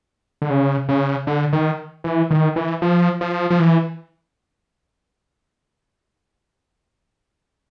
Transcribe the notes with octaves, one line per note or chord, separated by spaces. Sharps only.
D3
C#3
C#3
D3
D#3
E3
D#3
E3
F3
F3
F3
E3